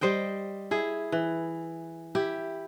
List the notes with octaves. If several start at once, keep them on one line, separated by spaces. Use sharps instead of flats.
G3 C5 D#5 G5
E4 G#4
E3
E4 G4